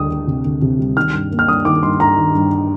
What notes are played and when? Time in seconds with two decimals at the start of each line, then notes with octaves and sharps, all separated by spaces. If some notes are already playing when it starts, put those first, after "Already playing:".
Already playing: D2 G3 D#6
0.10 D2
0.27 C3
0.45 D2
0.62 C3
0.79 G3
0.96 D#3 F6
1.14 G2
1.31 A#3
1.39 F6
1.48 G2 D#6
1.65 D#3 D6
1.83 G2 C6
2.00 G2 A#5
2.17 D#3
2.35 G2